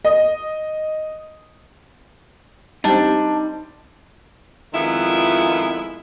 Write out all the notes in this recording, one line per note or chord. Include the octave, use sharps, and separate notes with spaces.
D#5
G3 C4 D4 D#4
F2 D#3 G#3 B3 E4 F4